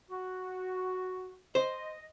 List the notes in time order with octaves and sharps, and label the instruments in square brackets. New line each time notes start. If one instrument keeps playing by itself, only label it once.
[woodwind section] F#4
[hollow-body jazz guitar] C5 [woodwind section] D#5